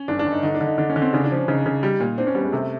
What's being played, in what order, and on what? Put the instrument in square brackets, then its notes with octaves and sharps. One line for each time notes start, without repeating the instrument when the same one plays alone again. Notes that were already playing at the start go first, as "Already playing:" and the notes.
Already playing: [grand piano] C#4
[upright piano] G1 [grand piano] D4
[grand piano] D4
[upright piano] G1
[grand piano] D#4
[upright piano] D3 [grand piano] D#4
[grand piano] D4
[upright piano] D3
[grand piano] D#4
[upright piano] D3 [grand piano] D4
[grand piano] C#4
[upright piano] D3
[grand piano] C4
[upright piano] C#3 [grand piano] D4
[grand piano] D4
[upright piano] F3
[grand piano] C#4
[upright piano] C#3 [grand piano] D#4
[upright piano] C#3
G3
A#2
[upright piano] C4 [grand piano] D4
[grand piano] C#4
[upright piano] G3 [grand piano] B3
[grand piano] G#3
[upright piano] C3 [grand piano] A3